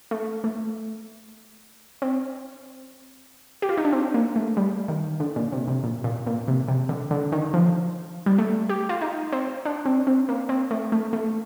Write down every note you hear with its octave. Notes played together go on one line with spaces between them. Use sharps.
A3
A3
C4
G4
F4
D#4
D4
C4
A#3
A3
G3
D#3
D3
A#2
C3
C3
A#2
A#2
A#2
C3
C3
D3
D3
D#3
F3
G3
A3
G4
F4
D#4
C4
D4
C4
C4
A#3
C4
A3
A3
A3